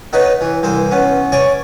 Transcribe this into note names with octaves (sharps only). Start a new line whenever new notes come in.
B3 D#4 B4 C#5
E3
C2 E3 C5
B3 C#4
C#5 D5 G#5 C#6